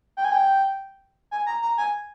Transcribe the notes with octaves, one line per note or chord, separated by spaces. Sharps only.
G5
G#5
G5
G#5
A#5
A#5
G#5